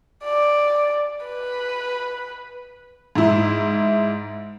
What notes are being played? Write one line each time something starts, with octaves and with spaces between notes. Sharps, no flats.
D5
B4
G#2 E4